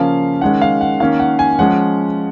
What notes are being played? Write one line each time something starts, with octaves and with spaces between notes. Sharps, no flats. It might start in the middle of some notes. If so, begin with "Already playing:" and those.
Already playing: C#3 F3 A#3 C#4 F5
D#3 G#3 C#4 F#5
F5
F#5
D#3 A#3 C#4 F5
F#5
G#5
F3 G#3 C#4 F#5